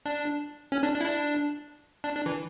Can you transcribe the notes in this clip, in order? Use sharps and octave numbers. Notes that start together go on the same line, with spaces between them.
D4
C#4
D4
D4
E4
D4
D4
D4
E3